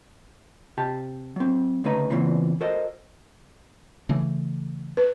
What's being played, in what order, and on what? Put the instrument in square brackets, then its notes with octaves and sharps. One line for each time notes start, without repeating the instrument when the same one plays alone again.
[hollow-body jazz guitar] C3 G4 A5
F#3 C4
D2 C#3 A3 D#4 B4 A#5
E2 A#2 C#3 E3 C4
F#4 A4 A#4 C5 D#5
[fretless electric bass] C#3 E3 A3
[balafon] B4